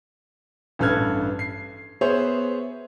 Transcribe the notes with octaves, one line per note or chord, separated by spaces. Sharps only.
A1 G2 A4 B4 F6 G#6
C7
B3 G#4 C5 C#5 E5